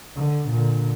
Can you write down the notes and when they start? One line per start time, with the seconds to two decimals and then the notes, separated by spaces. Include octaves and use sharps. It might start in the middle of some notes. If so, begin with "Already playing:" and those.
0.15 D3
0.50 A#2 D3